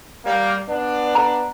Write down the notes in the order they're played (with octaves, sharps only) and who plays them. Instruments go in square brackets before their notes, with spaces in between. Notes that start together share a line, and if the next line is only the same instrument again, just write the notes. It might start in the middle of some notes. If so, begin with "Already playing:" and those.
[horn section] G3 A#3
B3 D4
[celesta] A#5